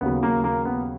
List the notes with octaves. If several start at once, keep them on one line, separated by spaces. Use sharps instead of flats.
D#2 C#3 F#3 B3
A#3
A#3
B3